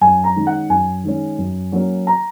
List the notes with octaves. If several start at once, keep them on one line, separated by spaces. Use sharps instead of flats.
F#2 G#5
A#5
D#3 G#3 C#4
F#5
F#2 G#5
D#3 G#3 C#4
F#2
F#3 A#3 C#4
A#5